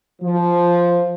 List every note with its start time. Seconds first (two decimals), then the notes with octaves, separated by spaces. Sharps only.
0.22 F3